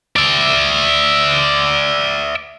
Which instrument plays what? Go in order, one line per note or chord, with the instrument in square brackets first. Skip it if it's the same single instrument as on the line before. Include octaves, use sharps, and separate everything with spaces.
[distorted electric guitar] D5 E5